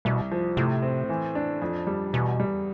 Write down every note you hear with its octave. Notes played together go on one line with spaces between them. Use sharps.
C2 B2
F3
A2 C3
C4
E3
D4
F2
G3
E2 B2
G3